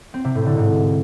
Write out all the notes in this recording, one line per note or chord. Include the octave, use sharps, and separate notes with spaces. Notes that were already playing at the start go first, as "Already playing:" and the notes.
C4
C3
A2
D3
G#2